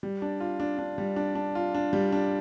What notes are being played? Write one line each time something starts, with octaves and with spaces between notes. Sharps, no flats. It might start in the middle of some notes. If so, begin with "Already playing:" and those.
G3
D4
F4
D4
D4
G3
D4
D4
F4
D4
G3
D4